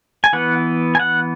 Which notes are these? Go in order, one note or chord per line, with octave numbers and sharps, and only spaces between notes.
G#5
E3 B3 F#5
G#5
F#5